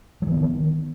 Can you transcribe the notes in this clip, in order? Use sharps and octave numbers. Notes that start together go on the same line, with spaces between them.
D#3 E3 F#3 B3